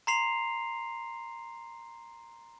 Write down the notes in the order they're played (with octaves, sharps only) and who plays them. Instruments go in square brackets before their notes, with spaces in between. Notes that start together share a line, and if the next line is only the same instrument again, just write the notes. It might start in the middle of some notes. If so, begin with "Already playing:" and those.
[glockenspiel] A#5 C6 C7 F7